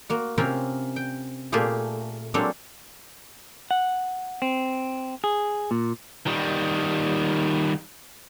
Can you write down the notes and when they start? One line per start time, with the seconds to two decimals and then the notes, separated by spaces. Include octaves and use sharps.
0.10 A#3 F#4
0.38 C3 A#3 C4 C#4 F4 A#4
0.96 G5
1.52 A#2 A3 A#3 F4 G4 G#4
2.34 F#3 G#3 A#3 C4 D4 A4
3.71 F#5
4.42 C4
5.24 G#4
5.71 A#2
6.26 D#3 G3